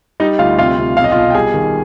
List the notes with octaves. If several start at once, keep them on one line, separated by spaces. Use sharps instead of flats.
G3 D#4 D#5
D2 F4 F5
C3 F4 F5
C3
B1 F5
D#5
F4 F5
B2
G5
G3 G#4 G#5
D#3